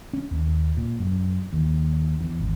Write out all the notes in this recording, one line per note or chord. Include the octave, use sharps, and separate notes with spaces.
C#4
D#2
A#2
F#2
D#2
E2
G#1